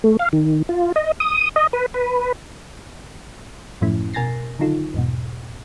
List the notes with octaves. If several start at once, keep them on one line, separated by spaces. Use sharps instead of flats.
A3
F5
D#3
F4
D#5
D#6
D#5
B4
B4
F#2 A2 F3 A3 C#4 E4
B2 A#4 G#5 A6 A#6 C7
D3 D#3 F#3 D#4 F4 A4
E2 G#2 B2